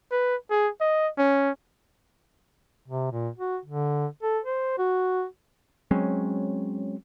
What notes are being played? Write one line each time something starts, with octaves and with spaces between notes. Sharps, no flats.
B4
G#4
D#5
C#4
C3
A#2
F#4
D3
A4
C5
F#4
F#3 G#3 C4 C#4